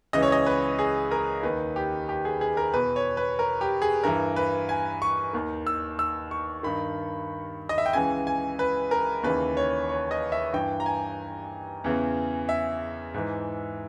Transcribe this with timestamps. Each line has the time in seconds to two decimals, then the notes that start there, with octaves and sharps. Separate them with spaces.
0.13 C#2 C#3 E3 D#5
0.23 C#5
0.32 D#5
0.46 B4
0.79 G#4
1.11 A#4
1.43 D#2 D#3 B4
1.76 G4
2.09 G4
2.25 G#4
2.41 G#4
2.57 A#4
2.73 E2 B2 B4
2.96 C#5
3.17 B4
3.39 A#4
3.61 G4
3.82 G#4
4.03 G2 E3 A#4
4.36 B4
4.69 G#5
5.02 C#6
5.33 D#2 D#3
5.67 E6
5.99 E6
6.31 C#6
6.63 G2 D#3 B5
7.69 D#5
7.78 E5
7.86 G5
7.93 C#2 C#3 E3 G#5
8.27 G#5
8.59 B4
8.91 A#4
9.23 D#2 C#3 E3 B4
9.57 C#5
9.89 C#5
10.11 D#5
10.32 E5
10.53 G2 E3 G5
10.80 A#5
10.86 G#5
11.84 E2 C#3 E3
12.49 E5
13.14 G#2 E3